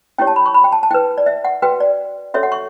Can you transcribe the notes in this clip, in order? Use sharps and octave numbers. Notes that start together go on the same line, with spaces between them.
C#4 E4 G4 C#5 G5
A5
B5
C#6
B5
G5
A5
A5
E4 B4 G5
D5
E5
F#5
F#4 B4 G5
D5
C#4 F#4 A4 C#5 E5
F#5
C#6